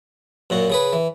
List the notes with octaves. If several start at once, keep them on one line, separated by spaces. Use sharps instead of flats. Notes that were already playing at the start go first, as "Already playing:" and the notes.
F#2 A#2 F#4
C#3 G#4 B4
E3